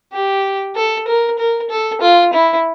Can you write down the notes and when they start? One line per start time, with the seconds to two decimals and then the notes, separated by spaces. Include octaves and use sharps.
0.13 G4
0.76 A4
1.07 A#4
1.38 A#4
1.70 A4
2.01 F4
2.33 E4